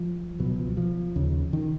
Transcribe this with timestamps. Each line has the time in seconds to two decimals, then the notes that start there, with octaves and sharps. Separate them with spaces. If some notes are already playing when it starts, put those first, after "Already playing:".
Already playing: F3
0.39 C#2 B2 F#3
0.59 F3
0.77 F3
1.16 D#2 C#3
1.53 D#3